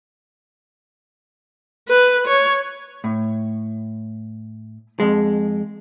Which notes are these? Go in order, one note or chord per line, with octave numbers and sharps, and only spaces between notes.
B4
C#5
A2
F2 G#3